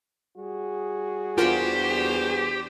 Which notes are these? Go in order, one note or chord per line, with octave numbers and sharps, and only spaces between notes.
G3 F#4 G#4
E2 D4 F4 G4 A#4 C5 F#5